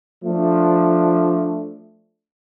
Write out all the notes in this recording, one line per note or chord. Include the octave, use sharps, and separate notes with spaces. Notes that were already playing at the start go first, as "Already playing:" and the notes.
F3 A3 D4